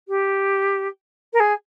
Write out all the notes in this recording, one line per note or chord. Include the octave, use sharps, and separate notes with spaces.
G4
A#4
G#4